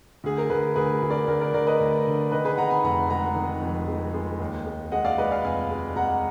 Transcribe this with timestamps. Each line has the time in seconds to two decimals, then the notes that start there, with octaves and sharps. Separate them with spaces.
0.24 D2 G#4
0.38 A#4
0.50 D2 G#4 B4
0.76 D2 G#4 B4
1.02 D2
1.10 A#4 D5
1.28 D2 A#4 D5
1.41 A#4 D5
1.54 D2 A#4 D5
1.67 B4 D#5
1.80 D2
2.06 D3
2.32 D#3 B4 D#5
2.45 G#4 B4
2.57 D#3 F#5 A#5
2.70 G#5 B5
2.84 F1 F#5 A#5
3.09 G#3 F#5 A#5
3.36 D#3
3.62 F2
3.88 G#3
4.14 G#3
4.40 D#2
4.66 G#3
4.92 G#3 D#5 F#5
5.05 D5 F5
5.18 G#3 B4 D#5
5.31 D5 F5
5.44 F1 F5 G#5
5.71 G#3
5.96 G#3 F#5 A#5